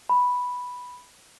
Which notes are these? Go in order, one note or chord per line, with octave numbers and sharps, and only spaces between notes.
B5